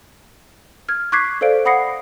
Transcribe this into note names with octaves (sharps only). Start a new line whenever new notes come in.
F6 G#6
C#6 D6 F#6 G#6 B6 C7
A4 C5 D5 F5 D7
F#5 B5 D#6 A#6 C7 C#7